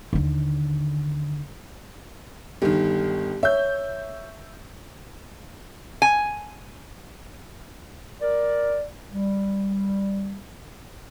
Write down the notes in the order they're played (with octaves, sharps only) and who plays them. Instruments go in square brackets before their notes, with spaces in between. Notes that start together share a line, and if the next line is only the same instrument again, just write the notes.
[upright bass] D#2 D3
[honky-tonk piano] G1 D#3 [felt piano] G4
[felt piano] C#5 [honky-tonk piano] E5 G6
[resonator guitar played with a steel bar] G#5
[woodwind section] A#4 D5
G3